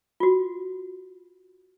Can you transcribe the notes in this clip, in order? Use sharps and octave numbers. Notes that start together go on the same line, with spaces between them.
F4 F#4